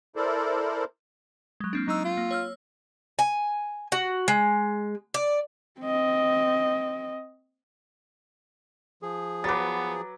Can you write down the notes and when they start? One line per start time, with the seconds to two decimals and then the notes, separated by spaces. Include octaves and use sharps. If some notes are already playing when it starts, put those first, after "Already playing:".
0.16 E4 A4 A#4 C5 D5
1.60 F#3 G#3
1.73 A#3 C4 D4
1.88 F#3 C4 D#4 E6
2.05 F4
2.17 A#3
2.31 C#5 E6 F6
3.19 G#5
3.92 F#4
4.28 G#3
5.14 D5
5.81 C4 D#5
9.02 F3 G#4
9.44 F#3 B3 B4 D6 A6